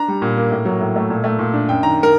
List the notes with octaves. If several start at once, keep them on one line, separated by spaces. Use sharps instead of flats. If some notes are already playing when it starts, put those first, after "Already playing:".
Already playing: D4 A#5
G3
A#2
A#3
A2
F#3
A2
A3
A#2
A3
A#2
D4
F#2 G5
D#3 A#5
A#4